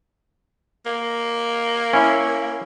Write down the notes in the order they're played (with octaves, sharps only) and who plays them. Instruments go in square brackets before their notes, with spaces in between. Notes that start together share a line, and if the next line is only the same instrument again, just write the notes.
[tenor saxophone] A#3
[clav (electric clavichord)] C#4 E4